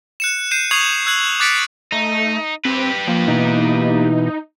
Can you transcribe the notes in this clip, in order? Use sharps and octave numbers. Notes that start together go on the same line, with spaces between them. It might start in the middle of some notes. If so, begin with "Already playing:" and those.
F#6 C#7 E7
G6 C7 D#7 E7
C#6 D#6 G#6 C7 F7 F#7
E6 F#6 G#6 F#7
D6 F#6 A6 B6 C#7 D7
A3 D#4
C4 G4 B4
F3 A#3
B2 E3 D#4